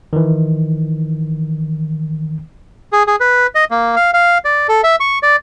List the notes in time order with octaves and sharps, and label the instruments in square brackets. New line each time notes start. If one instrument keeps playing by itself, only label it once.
[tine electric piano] D#3 E3
[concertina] G#4
G#4
B4
D#5
A#3
F5
F5
D5
A4
E5
C#6
D5